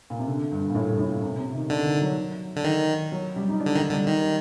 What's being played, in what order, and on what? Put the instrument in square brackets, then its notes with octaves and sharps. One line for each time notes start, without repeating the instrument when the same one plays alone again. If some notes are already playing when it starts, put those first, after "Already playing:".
[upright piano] A#2
C3
D3
G2
A#2
A2
G2
A2
A#2
C3
C3
D#3
[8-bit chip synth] D3 [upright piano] D#3
[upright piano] D#3
F#3
[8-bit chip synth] D3
D#3
[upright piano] F#3
G3
D#4
D4
[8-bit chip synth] D3
[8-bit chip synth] D#3 [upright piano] D#4
[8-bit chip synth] D3 [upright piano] G3
[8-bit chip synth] D#3